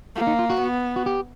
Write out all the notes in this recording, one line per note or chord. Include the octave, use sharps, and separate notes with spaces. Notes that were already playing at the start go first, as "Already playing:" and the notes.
A#3
D#4
F4
F#4
B3
F#4
G4